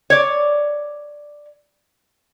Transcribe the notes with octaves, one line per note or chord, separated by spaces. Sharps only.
C#5 D5